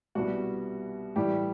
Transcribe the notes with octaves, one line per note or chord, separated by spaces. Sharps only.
C2 B2 G3 F#4
A2 E3 G3 G4